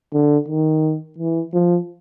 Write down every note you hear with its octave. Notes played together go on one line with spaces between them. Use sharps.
D3
D#3
E3
F3